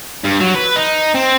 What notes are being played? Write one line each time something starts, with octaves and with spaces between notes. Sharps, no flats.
G2
F#3
B4
D#4
C4